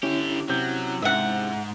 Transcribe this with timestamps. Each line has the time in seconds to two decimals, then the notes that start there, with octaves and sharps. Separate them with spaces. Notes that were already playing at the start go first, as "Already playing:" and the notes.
0.03 D3 C#4 E4 G4
0.49 C3 F#3 G6
1.02 G#2 E5 F#5